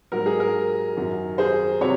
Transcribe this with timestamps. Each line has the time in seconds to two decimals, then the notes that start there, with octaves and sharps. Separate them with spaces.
0.12 G#2 F#3 A#4
0.26 G#4
0.40 A#4
0.97 F#2 D#3 F#3
1.38 G#4 C5
1.81 C3 F#3 C#5